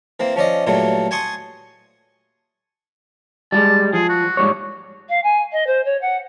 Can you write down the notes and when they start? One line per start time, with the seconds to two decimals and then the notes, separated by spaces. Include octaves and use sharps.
0.20 E3 A#3 C4
0.36 F3 C#4 D5 D#5
0.67 A#2 E3 F#3 G3 A3
1.11 G#5 A5 C6 C#6 D#6
3.52 G3 G#3 A5
3.93 F3 G#4
4.10 F#4
4.37 G#2 G3 C#5
5.09 F5
5.24 G#5
5.52 D#5
5.67 C5
5.85 C#5
6.02 F#5